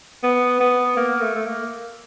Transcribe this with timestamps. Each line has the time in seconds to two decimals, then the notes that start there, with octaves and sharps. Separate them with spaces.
0.23 B3
0.60 B3
0.97 A#3
1.21 A3
1.35 A3
1.46 A#3